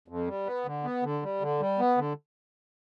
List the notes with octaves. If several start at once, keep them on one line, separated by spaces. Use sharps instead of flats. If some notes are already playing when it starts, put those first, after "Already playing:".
F2
G3
B3
D3
B3
D3
G3
D3
G3
B3
D3